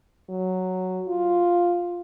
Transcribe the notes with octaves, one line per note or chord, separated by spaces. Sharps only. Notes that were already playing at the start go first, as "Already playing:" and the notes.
F#3
F4